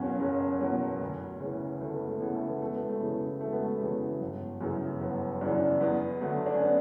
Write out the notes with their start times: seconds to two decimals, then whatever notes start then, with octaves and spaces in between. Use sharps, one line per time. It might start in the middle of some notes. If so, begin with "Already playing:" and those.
Already playing: F#1 E2 B2 F#3 B3 C#4
0.20 F#1 C#4
0.60 E2 B2 F#3
1.01 D2
1.40 C#3 E3
1.81 D2 A3
1.94 B3
2.08 A3
2.20 C#3 E3 B3
2.35 A3
2.48 B3
2.61 E1 A3
2.76 B3
2.89 A3
3.00 E2 C#3 E3
3.40 E1 A3
3.53 B3
3.63 A3
3.80 E2 C#3 E3
4.20 G1
4.61 F#2 C#3 E3
5.01 G1 B3
5.41 F#2 C#3 E3 D4
5.81 E2 B3
6.21 D3 F#3 A3
6.46 D4
6.54 C#4
6.61 B3